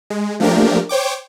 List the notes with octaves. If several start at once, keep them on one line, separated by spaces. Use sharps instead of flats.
G#3
F3 A3 A#3 D4 G4 A#4
C5 C#5 G5 D6